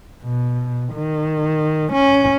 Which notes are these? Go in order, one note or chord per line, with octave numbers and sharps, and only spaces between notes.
B2
D#3
C#4